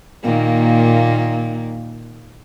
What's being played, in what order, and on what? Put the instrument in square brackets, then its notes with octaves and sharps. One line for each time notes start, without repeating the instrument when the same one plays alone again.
[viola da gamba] A#2 D#3 A#3